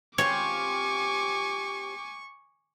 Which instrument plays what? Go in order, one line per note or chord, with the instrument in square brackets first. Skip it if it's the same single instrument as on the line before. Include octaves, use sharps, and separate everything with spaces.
[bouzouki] C4 F4 G4 [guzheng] C#5 [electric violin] G#5 D6 [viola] C#6